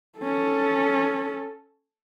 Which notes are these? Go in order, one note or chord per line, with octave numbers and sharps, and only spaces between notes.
C#4 A4